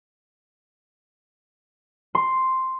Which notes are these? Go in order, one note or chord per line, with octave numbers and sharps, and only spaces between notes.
C6